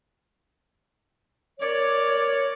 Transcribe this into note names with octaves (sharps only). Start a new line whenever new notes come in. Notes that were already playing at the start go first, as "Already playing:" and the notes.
A#4 C#5 D5